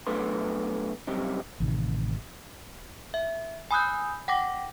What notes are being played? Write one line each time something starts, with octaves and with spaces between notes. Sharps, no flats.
B2 F#3 A3 D4 B4 C6
F#2 C3 G3 C4 D#4
A1 C3 D#3
E5
G#5 B5 D#6 E6 F#6 G6
F#5 G5 D6 A#6